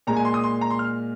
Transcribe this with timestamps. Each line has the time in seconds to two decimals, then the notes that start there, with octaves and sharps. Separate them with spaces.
0.07 A#2 G#3 A#5
0.16 G#5
0.25 C6
0.34 D#6
0.44 C6
0.61 A#5
0.70 C6
0.79 F6